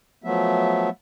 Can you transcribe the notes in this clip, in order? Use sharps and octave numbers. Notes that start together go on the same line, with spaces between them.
F3 F#3 A3 B3 E5